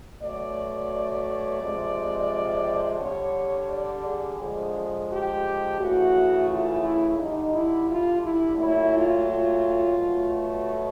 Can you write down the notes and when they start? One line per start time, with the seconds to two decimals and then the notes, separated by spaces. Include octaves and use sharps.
0.22 B2 F#3 A3 D5
1.61 C3 F3 G#3
3.00 D3 G3 C#5
3.71 D5
4.05 G#4
4.40 D3 F3 G#3
5.10 G4
5.79 C#3 E3 A3 F#4
6.49 F4
6.84 E4
7.19 D3 G3 D#4
7.53 E4
7.89 F4
8.23 E4
8.58 A#2 F#3 A3 E4
8.93 F4
9.27 F4
9.97 B2 F#3 A3